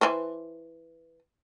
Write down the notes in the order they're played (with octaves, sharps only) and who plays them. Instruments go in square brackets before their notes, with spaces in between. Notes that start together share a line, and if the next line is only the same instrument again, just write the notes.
[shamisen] E3 B4 C5